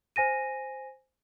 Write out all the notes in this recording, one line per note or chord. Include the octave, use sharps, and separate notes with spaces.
C5 G#5 A#6 D#7